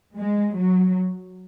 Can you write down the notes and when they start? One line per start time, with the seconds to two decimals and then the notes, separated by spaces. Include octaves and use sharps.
0.16 G#3
0.57 F#3